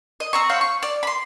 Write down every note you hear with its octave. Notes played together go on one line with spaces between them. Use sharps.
D#5
C4 A#5 C#6
C5 C#5 F5 F#5
C#6
D5
B5 C6